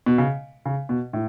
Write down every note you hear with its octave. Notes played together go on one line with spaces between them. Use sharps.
B2
C#3
C#3
B2
A2